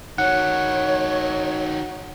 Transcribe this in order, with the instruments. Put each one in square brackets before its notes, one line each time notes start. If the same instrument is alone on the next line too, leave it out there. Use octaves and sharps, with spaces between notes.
[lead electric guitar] D#3 F#4 [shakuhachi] C#5 [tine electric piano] F#5